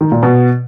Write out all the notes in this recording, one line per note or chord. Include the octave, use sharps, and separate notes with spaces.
D#3
A#2
B2